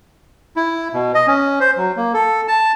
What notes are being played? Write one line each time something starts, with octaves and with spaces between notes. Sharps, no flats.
E4
B2
D#5
C#4
C5
F#3
A#3
A4
A5